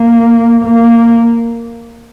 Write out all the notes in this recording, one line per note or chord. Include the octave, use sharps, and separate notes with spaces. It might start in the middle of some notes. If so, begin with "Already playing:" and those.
Already playing: A#3
A#3